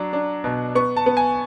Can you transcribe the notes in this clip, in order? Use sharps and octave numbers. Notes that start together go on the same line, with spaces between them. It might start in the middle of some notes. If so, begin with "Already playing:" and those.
Already playing: F#3 D4
D4
B2
B3 C#6
A5
B3
G#5